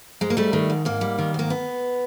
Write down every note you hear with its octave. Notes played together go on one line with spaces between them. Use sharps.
G#2 G#3
A#3
G3 A3
D#3
G#2
G#2 A#3
G3
D#3
G#2 A#3
B3